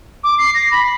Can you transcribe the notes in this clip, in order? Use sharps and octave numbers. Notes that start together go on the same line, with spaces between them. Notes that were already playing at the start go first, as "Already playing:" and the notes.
D6
C7
A#6
B5